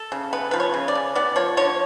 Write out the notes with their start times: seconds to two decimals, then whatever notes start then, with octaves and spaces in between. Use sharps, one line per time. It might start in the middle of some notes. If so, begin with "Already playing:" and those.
Already playing: A4
0.12 C#3
0.33 B3 B4
0.51 F3 B4
0.60 C#5
0.74 C#3
0.88 D5
0.95 C#3
1.15 B3 D5
1.36 F3 C#5
1.57 D3 C#5